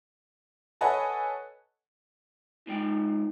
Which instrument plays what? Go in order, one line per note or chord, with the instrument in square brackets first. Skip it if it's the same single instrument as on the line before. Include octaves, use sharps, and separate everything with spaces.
[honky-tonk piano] A4 B4 C#5 D#5 F#5 G#5
[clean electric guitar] A#2 G#3 G5 [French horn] D#4